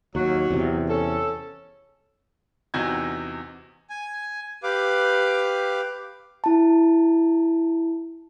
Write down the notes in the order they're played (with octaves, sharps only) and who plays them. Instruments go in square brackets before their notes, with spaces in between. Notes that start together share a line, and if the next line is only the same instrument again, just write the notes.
[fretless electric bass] D#2 [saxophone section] F#3 F#4
[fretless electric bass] E2 C3
[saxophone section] C#4 A4
[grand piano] E2 C3 D#4 F#4 G6 G#6
[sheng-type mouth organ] G#5
G4 B4 F5 D6
[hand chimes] E4 A5